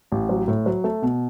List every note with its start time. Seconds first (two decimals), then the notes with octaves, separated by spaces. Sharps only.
0.12 A1
0.29 F#3
0.48 A2
0.66 F#3
0.84 A3
1.02 B2